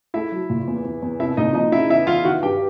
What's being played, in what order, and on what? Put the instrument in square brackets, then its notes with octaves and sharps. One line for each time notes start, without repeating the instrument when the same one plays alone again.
[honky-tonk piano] A3 [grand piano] E4 E5
[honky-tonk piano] F#3
A#2
E2
E2
E2
[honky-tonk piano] C2 [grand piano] E4 E5
[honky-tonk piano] A#2 [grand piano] D#4 D#5
[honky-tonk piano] F3 [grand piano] D#4 D#5
[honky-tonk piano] C#3 [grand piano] E4 E5
[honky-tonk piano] E2 [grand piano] E4 E5
[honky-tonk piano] E3 [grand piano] F4 F5
[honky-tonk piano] D#3 [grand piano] F#4 F#5
[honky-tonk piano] G2 [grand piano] G4 G5